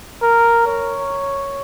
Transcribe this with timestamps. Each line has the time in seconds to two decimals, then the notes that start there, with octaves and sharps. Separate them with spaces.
0.23 A#4
0.67 C#5